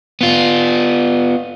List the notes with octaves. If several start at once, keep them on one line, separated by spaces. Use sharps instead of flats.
B3 F4